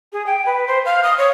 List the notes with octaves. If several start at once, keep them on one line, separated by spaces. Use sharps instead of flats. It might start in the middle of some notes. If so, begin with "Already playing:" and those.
G#4
G5
B4
C5
F5
D#6
C#5